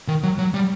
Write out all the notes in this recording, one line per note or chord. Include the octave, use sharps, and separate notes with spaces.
D#3
F#3
F#3
G3